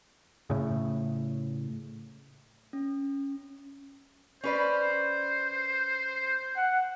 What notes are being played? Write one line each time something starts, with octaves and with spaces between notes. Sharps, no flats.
A2 C#3
C#4
C#4 B4 C5 D5
F#5